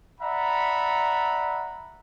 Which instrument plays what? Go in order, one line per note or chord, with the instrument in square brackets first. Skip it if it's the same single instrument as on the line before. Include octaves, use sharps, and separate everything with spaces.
[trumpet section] D5 E5 F#5 A#5 B5